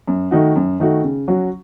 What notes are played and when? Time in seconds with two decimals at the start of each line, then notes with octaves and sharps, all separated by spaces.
0.07 F#2
0.31 D#3 A3 D#4 F#4
0.56 F#2
0.80 D#3 A3 D#4 F#4
1.03 C#3
1.28 F#3 C#4 F#4